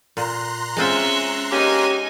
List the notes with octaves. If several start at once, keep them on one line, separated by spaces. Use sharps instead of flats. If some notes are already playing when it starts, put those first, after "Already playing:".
A#2 A#5 C6 F#6
G#3 C4 C#4 F4 E5
A#3 C#4 D#4 G4 G#5